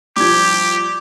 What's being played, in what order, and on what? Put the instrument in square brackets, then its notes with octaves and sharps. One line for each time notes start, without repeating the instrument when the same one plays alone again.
[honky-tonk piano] F3 G3 [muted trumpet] G4 [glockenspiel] D6 G#6